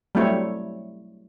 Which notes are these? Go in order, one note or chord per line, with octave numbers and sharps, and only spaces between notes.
F#3 G3 A3 C4 E4 C#5